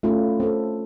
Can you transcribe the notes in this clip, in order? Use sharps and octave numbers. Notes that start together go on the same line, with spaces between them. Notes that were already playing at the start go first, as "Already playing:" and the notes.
A3 C#4 E4 F4
C4 A4